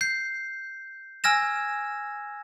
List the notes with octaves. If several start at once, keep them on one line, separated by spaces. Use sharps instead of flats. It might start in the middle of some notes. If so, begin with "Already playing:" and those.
G6 C7
G#5 E6 F6 G#6 A#6 E7